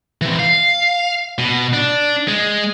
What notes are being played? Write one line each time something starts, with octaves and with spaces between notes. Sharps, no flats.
E3 C4
F5
B2
D4
G#3